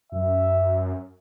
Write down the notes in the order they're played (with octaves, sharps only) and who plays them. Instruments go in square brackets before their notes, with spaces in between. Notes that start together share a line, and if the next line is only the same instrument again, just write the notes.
[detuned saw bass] F#2 [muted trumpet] E5